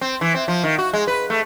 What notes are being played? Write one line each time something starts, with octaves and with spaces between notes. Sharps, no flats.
C4
E3
C4
F3
D#3
F#4
G#3
B4
A3